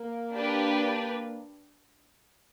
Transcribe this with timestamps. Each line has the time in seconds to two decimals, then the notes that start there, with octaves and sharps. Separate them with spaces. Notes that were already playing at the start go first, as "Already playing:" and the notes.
Already playing: A#3
0.33 D4 G4 B4